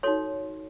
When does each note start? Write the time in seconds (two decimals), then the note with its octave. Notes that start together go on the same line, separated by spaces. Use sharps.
0.03 D#4 F#4 A4 C#5 C6